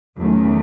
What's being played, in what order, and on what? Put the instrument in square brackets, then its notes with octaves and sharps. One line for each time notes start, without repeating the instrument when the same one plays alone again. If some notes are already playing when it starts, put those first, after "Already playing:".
[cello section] E2 [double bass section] D#3 F#3 A3 C#4